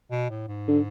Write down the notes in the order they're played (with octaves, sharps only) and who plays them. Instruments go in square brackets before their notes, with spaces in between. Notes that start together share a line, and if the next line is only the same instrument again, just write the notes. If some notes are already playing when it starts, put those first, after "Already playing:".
[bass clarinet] B2
A2
G#2
[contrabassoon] D3